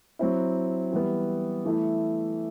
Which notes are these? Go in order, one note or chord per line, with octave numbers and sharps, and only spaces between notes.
F#3 C4 E4
E3 G3 B3
E3 A3 E4